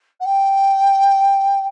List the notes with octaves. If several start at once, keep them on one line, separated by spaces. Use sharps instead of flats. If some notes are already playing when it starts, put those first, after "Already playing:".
F#5
G5